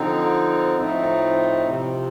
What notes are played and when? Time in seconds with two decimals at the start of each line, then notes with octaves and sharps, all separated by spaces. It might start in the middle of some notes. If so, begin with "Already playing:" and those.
Already playing: D3 F3 C4 D#4
0.77 A2 F3 A3 C4 D#4
1.67 C3 F3 C4